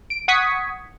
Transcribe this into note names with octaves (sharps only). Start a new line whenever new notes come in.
D7
F#5 C#6 D#6 G#6 B6 C#7